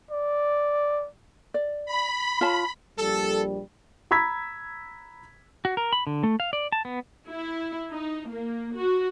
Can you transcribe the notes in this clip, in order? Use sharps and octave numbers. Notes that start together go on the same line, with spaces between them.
D5
D5
B5
F4 C#5 A5
A#1 G3 A4
A#5 B5 E6 G#6 B6
F#4
A#4
B5
D3
A3
F5
D5
A5
B3
E4
D#4
A#3
F#4